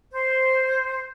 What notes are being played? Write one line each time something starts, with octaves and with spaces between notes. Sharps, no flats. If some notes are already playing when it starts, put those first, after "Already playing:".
C5